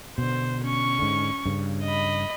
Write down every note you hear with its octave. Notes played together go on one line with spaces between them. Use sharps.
B2 D3 C5
C#4 C#6
G#2 D3
G2 C#3
D#5 B5